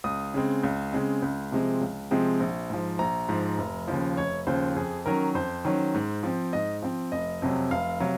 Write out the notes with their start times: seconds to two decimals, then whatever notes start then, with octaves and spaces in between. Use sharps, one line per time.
0.04 C#2 D#6
0.34 C#3 G#3 C4
0.63 C#2
0.93 C#3 G#3 C4
1.22 C#2
1.52 C3 F3 G#3 C4
1.81 C#2
2.11 C3 F3 G#3 C4
2.40 A#1
2.70 G#2 F3
2.99 A#1 A#5
3.29 G#2 F3
3.58 F1
3.88 D#2 C#3 F3
4.17 F1 C#5
4.47 D#2 C#3 F3 C5
4.76 F2 G#4
5.06 D#3 F#3 C#4 A#4
5.35 F2 C5
5.65 D#3 F#3 C#4
5.94 G#2
6.23 F3 C4
6.53 G#2 D#5
6.82 F3 C4
7.12 F1 D#5
7.42 F2 C3 F#3
7.71 F1 F5
8.00 C3 F#3